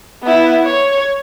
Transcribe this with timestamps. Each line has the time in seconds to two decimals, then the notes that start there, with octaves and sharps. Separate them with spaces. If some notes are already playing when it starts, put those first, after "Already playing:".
0.23 B3 E4
0.64 C#5